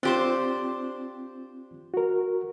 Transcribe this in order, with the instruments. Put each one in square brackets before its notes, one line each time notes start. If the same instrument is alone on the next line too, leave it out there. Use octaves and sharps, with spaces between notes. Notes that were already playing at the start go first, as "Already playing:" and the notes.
[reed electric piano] C4 F4 C6 [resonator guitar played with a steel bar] D4 G4 C5
[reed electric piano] F#4 A#4